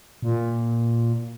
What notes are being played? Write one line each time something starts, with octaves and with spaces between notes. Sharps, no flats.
A#2